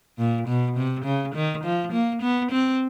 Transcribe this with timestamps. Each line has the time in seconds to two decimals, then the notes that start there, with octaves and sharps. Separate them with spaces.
0.19 A#2
0.48 B2
0.77 C3
1.05 C#3
1.35 D#3
1.64 F3
1.92 A#3
2.22 B3
2.51 C4